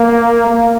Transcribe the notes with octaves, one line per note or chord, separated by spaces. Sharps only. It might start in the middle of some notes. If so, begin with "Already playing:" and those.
Already playing: A#3
A#3